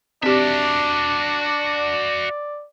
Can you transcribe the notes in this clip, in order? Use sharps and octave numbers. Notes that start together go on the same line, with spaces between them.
C4 D4 F#4 G4 D5 E5